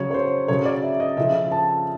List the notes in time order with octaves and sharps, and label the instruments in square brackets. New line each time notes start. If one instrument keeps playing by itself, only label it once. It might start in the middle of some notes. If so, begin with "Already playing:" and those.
Already playing: [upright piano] C#3 F#3 C#5
C#5
C5
C#3 F#3 C#5
D5
E5
D#5
C#3 F3 E5
A5